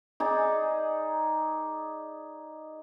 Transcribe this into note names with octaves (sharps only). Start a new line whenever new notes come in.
D#4 G#4 D5